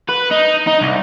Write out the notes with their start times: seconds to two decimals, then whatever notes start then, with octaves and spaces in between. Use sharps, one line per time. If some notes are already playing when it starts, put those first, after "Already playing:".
0.09 B4
0.31 D#4
0.67 D#4
0.81 C2